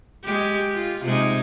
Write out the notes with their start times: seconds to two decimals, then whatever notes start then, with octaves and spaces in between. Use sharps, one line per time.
0.23 G#3 G4
0.74 F4
1.04 C3 G#3 D#4